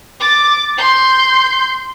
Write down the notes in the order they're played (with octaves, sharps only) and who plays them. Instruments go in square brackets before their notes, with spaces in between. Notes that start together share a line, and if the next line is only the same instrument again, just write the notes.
[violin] D6 A6
C6 G6